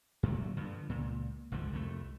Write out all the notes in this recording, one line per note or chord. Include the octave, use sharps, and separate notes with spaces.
F#2 A#2 D3 F#3
G2 D3 F3
C#2 A#2
G#1 C#2 D3 F3
C2 F2 E3 A3